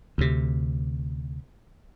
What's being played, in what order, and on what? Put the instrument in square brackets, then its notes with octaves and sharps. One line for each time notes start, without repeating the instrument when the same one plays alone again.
[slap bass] D2 C3